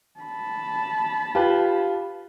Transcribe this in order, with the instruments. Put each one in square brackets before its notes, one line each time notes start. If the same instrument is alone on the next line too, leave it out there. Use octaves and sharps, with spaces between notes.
[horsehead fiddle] A5 B5
[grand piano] F4 G4 B4